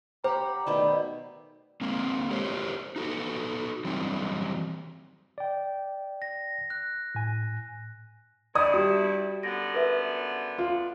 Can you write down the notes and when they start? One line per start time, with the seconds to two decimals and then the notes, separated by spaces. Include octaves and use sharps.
0.24 G4 C5 F#5 A#5 B5
0.67 B2 D#3 A3 D5 B5
1.81 G#3 A#3 C4
2.30 G4 A#4 C5 C#5
2.96 D#4 F#4 A4
3.85 E3 F#3 G3 C4
5.38 D5 G5
6.22 A#6
6.70 F#6
7.15 A2 G#5
8.55 G2 E4 D5 D#6 G#6
8.74 G3 F#4 D5
9.43 F#2 D3 B3 A#6
9.74 A#4 B4 E5
10.58 F4